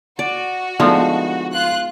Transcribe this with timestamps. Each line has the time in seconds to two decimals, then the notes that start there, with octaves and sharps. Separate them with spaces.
0.19 F#4 D5
0.80 D3 F3 G#3 A3 B3 D#4
1.51 F4 F#6